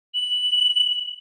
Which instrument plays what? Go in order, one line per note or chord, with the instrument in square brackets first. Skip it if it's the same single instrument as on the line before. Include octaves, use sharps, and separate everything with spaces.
[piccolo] F#7